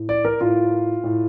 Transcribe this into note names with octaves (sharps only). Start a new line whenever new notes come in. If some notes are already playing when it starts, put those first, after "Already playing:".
Already playing: A2
D5
A#4
A2 F4
A2